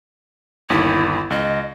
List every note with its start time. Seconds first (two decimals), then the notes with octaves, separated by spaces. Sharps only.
0.70 G1 D#2 E4 B6
1.30 C#2 D#5